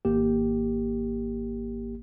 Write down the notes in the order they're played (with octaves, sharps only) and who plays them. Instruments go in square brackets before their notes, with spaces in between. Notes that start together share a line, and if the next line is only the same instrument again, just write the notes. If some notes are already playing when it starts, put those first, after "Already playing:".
[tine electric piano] G#1 A#3 G4